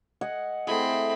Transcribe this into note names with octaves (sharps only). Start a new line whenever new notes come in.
D#5 F#5 G#5
A3 C4 E4 G#4 B5